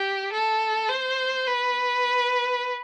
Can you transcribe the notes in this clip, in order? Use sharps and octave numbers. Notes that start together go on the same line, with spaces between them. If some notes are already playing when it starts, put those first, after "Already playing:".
Already playing: G4
A4
C5
B4